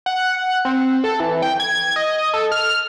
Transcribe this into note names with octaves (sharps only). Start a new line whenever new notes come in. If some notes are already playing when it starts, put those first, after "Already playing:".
F#5
C4
A4
E3
G5
G#6
D#5
A4
F6